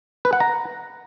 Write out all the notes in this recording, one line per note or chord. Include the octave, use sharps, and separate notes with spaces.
B4
F#5
A#5